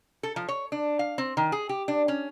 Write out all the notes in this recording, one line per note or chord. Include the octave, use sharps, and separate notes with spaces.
A4
F3
C#5
D4
F5
C4
D#3
G#4
G4
D4
C#4